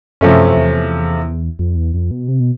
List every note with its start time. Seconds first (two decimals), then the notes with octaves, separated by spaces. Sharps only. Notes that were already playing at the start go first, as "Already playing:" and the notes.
0.21 F#2 C3 F3 A3 C#4
0.56 E2
1.59 F2
1.76 E2
1.94 F2
2.11 B2
2.28 C3
2.40 B2